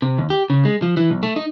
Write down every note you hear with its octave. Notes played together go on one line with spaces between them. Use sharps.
C3
D#2
G4
C#3
G#3
F3
E3
B1
A3
D#4